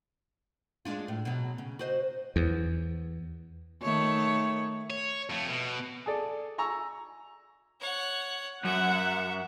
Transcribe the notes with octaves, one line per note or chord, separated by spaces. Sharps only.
G#3 D4 F4
A2
B2 F#3
C#3
F#4 C5 D#5
E2
D#3 A3 C#5
C#5
F2 A3
B2
G#4 A4 D5
G#5 A#5 C#6 E6
C#5 F#5
F#2 E5 F#5